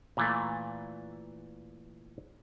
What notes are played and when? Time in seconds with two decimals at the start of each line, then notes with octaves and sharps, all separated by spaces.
0.17 A#2 E3 A3